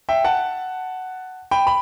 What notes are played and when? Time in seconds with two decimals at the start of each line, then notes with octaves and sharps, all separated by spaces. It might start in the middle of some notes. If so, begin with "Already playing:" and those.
0.09 E5 G5
0.24 F#5 A5
1.51 G5 B5
1.67 B5